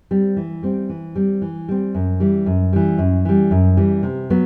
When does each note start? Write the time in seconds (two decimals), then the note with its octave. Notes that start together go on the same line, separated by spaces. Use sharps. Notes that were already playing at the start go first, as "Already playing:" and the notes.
0.11 G3 C4
0.37 E3
0.63 G3 C4
0.89 E3
1.15 G3 C4
1.42 E3
1.69 G3 C4
1.95 F#2
2.20 E3 G3
2.46 F#2
2.73 E3 G3
2.98 F#2
3.25 E3 G3
3.51 F#2
3.77 E3 G3
4.03 C3
4.30 F#3 B3